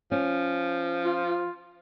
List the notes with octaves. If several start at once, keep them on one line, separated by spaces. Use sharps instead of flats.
F3 C#4
F4